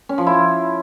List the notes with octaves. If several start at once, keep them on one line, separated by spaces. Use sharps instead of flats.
C#4
F3
E4